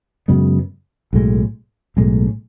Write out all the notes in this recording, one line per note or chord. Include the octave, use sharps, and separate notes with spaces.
F#2 C#3 G#3 B3
B1 A2 G#3
B1 A2 G#3